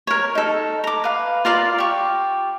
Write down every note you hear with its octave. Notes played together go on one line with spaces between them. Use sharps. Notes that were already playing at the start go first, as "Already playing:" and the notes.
A#4 C#5
D#4 A4
A#5 D6
B4 F5
F4 A#4 D5 F5
G4 C#6